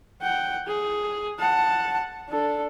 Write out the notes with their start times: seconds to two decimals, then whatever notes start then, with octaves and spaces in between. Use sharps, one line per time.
0.22 F#5 G5
0.67 G#4
1.39 F#5 A5
2.29 D4 A4